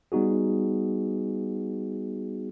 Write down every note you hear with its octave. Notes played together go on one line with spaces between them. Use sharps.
G3 B3 D#4 F#4 G#4